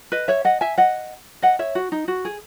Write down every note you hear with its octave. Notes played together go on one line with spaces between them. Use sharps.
B4 D#5
C#5 E5
D#5 F#5
E5 G#5
D#5 F#5
D#5 F#5
C#5 E5
F#4
D#4
F#4
G#4